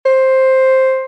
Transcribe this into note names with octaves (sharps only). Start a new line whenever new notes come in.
C5